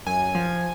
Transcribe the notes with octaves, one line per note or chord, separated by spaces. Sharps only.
F#2 G#5
F3